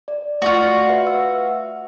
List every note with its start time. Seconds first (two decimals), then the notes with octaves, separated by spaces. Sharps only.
0.08 D5
0.42 A3 F4 F#4 D5 C#6
0.89 B4 E5
1.07 E6